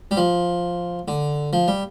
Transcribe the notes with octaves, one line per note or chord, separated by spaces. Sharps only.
G3
F3
D3
F3
G3